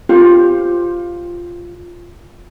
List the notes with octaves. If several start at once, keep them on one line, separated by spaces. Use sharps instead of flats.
F4 G4 C5